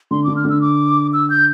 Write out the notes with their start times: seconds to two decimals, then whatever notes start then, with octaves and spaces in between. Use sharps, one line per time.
0.11 D3 C6
0.24 D3 D6
0.36 F6
0.45 D3 E6
0.61 D6
1.13 E6
1.30 G6